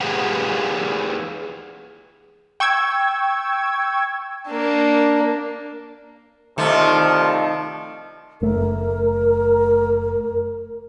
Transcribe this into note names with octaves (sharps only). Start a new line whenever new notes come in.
G4 G#4 B4 F5 F#5
G5 C#6 E6 G#6
A#3 D4
C2 C3 D#3 F3 A3
F#1 A3 A#4